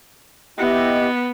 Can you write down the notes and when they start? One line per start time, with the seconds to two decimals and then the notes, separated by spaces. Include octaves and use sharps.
0.58 B3 E4 G4 D#5